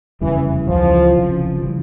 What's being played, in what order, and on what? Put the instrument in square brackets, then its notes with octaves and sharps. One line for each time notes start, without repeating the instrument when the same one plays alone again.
[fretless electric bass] F1 E2 C#3 G3 [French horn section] E3
[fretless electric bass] C#2 C#3 E3 [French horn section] F3
[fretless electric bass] F1 F2 C#3 F3
C#3 E3 G3